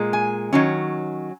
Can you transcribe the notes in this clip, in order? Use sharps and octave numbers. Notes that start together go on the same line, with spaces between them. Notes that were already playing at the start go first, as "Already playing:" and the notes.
Already playing: A#2 G#3
G#5
D#3 F#3 C#4